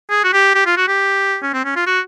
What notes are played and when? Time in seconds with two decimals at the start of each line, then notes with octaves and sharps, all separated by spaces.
0.10 G#4
0.24 F#4
0.33 G4
0.55 G4
0.66 F4
0.77 F#4
0.88 G4
1.43 C#4
1.54 C4
1.65 C#4
1.76 F4
1.87 F#4